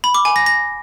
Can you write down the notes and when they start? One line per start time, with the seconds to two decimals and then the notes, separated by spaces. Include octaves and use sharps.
0.04 B5
0.14 D6
0.25 G#5
0.36 A#6
0.46 A#6